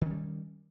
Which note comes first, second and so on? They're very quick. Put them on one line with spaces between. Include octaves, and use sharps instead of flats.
D#3 C#4 G3